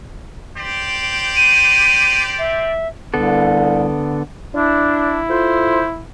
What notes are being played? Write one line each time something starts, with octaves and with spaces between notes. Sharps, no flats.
G4 C5 D5
D#7
E5
C2 D3 B3 A4
D4 E4
F4 A4 C5